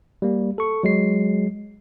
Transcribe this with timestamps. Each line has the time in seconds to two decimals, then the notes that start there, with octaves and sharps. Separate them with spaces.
0.22 G3 A#3
0.58 A4 C#6
0.83 F#3 G#3 C7